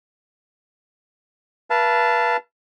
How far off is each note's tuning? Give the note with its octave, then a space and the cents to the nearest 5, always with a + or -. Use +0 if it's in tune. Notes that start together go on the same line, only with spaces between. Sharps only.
B4 -35 F5 -40 A5 -5